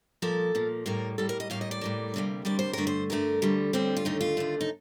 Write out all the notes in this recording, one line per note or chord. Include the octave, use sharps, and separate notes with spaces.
A#2 F3 A#3 A4
A#2 F3 A#3
A2 G3 A#3 A#4
A2 G3 A#3 A4
A#4
D#5
A2 G3 A#3 F5
D#5
D5
A2 G3 A#3
D2 C3 G3 A#3
D2 C3 G3 A#3 D5
C5
G2 D3 A3 A#4
C5
G2 D3 A3 A#4
D2 D3 G3
D2 D3 G3 C4
F4
D#2 D3 A3 D#4
F4
D#2 D3 A3
D#4